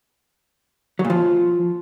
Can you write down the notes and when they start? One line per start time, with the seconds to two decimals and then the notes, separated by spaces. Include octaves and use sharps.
0.99 F#3
1.05 A#2
1.10 F3